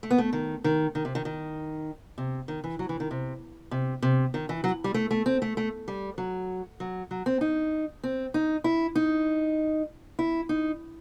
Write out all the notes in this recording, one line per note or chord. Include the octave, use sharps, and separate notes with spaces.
A3
B3
A3
D#3
D#3
D#3
C3
D#3
D#3
C3
D#3
E3
F#3
E3
D#3
C3
C3
C3
D#3
E3
F#3
G3
A3
A3
C4
A3
A3
G3
F#3
F#3
F#3
C4
D#4
C4
D#4
E4
D#4
E4
D#4